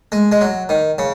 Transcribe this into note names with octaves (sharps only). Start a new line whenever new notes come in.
G#3
G#3
F#3
D#3
C#3